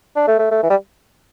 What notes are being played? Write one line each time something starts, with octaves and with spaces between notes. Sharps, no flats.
D4
A3
A3
A3
E3
G3